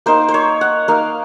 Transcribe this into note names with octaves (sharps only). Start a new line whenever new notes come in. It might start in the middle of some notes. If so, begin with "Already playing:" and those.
A#3 D#4 C5
C5
C#5
F#5
A#3 D#4 F5